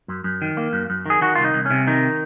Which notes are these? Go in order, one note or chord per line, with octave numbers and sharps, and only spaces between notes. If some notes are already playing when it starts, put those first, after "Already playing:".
F#2
F#2
D#3
A#3
F#2
F#2
D#3 G#4
D#3 F#4
F4
C2
D#4
C2
C3 C#4
D#3 D#4